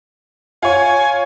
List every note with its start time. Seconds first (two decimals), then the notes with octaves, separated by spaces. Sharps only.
0.63 F4 C#5 G#5